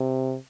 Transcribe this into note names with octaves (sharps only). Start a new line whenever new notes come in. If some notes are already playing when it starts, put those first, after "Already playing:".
Already playing: C3